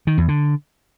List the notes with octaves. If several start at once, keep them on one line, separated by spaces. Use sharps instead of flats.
D#3
E2
D3